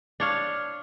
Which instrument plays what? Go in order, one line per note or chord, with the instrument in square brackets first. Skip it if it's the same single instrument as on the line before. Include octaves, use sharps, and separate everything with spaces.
[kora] D4 C#5 F5